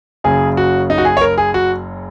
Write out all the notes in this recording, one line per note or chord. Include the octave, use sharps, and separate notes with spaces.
F#1 F#2 C#3 G#4
F#4
D#4
F#4
G#4
C#5
A#4
G#4
F#4